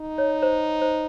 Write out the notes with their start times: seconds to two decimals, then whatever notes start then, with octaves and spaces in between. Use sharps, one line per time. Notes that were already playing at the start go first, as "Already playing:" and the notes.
Already playing: D#4
0.18 C#5
0.42 C5
0.82 C5